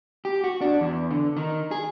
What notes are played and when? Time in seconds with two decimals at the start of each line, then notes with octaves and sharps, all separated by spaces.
0.25 G4
0.44 F#4
0.61 D4
0.81 E2
1.11 D3
1.37 D#3
1.71 G#4